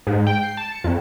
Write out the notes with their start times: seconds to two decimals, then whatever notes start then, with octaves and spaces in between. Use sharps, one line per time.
0.07 G#2
0.27 G5
0.43 C7
0.57 A5
0.72 C#7
0.84 F2